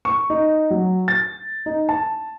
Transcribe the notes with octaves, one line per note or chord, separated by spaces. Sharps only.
C#6
D#4
F#3
A6
D#4
A5